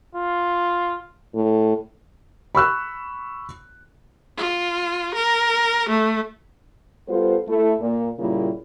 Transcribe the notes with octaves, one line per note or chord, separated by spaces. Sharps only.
F4
A2
B5 C#6 E6 F#6
F4
A#4
A3
G3 B3 F4 A4 C5
A3 E4
A#2
A#2 C#3 G3 A#3 E4 F4